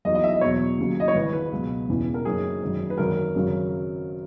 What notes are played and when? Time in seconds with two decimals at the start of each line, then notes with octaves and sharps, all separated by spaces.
0.05 E2 D#3 F#3 D#5
0.15 D#5
0.24 E5
0.33 D#5
0.41 E2 B2 F#3 C#5
0.78 D#2 C#3 F#3
1.00 D#5
1.08 C#5
1.15 G#1 G#2 E3 B4
1.33 B4
1.52 C#2 B2 F#3
1.89 E1 E2 C#3 E3
2.14 A#4
2.25 F#1 F#2 D#3 G#4
2.62 G#1 F#2 D#3 F#3
2.90 B4
2.98 G#1 F#2 D#3 F#3 A#4
3.35 G#1 F#2 C#3 F#3